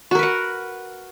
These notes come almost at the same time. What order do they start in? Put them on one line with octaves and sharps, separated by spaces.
F#4 A#4 B4 F#5